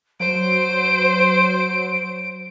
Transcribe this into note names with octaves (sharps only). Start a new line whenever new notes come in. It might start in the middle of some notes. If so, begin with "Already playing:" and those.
F#3 C5 D7